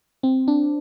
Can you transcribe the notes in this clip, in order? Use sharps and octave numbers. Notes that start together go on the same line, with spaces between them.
C4
D4